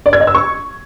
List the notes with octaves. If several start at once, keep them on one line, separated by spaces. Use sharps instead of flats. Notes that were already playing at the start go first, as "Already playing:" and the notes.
D5
G#6
D#5
E6
C#6